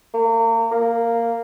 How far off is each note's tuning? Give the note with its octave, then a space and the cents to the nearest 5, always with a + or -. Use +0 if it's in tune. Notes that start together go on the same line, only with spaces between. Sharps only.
A#3 -35
A#3 -10